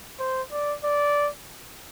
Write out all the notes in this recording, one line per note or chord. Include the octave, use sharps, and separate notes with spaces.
C5
D5
D5